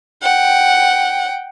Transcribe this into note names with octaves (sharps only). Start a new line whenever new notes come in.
F#5 G5